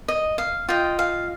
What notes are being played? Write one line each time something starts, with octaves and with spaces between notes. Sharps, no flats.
D#5
F5
F4 D#5 G5
F5